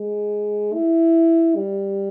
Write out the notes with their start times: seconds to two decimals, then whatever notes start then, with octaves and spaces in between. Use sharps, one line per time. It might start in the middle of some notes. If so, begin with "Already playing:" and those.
Already playing: G#3
0.74 E4
1.55 G3